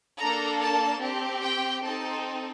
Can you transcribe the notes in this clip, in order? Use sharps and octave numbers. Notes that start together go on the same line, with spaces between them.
A#3 D4 A4 A#5
A5
C4 G4
G5
C4 D#4 A4 A5